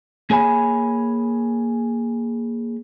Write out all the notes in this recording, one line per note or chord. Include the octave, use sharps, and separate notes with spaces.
A#3 G#4 C#5 G#5 B5